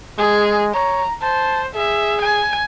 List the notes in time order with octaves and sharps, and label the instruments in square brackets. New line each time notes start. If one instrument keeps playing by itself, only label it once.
[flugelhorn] G#3 [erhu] G#4
[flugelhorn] C#5 [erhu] A#5
[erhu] C5 [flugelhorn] A5
[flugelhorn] G#4 [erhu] E5
[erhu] G#5